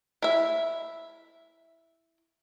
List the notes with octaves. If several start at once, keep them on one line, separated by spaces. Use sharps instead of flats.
E4 E5